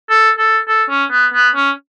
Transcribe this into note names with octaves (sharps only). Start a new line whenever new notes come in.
A4
A4
A4
C#4
B3
B3
C#4